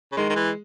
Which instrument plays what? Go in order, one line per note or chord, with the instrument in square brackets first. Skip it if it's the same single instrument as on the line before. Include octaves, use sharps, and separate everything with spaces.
[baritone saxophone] C#3
[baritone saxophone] D#3 [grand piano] G#3
[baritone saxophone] D#3
E3